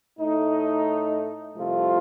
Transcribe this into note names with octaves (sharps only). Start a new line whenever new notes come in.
A2 A3 D#4
C2 C3 F3 A3 F4